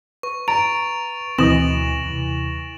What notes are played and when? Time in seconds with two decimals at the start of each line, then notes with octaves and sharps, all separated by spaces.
0.23 B4 C#6
0.48 A#5 A6 D7 F7
1.38 D2 B2 E3 C4 D#5 A#6 E7 F#7
2.05 D#2 C3